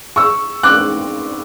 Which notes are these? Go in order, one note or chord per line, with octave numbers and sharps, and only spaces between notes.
C#6 E6
D6 F#6